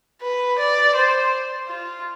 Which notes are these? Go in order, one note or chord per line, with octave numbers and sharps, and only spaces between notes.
B4
D5
C5
F4